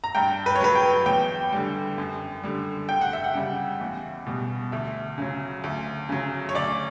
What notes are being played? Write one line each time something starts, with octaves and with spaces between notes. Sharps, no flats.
A#5
G2 G5
B4
C#5
F#3 B4
G5
E2 G5
D3 G3
F#2
D3 G3
D2 G5
F#5
E5
F#5
C#3 G3
E2
B2 G3
D2 E5
C#3 F#3
D2
C#3 F#3
C#5
D2 D5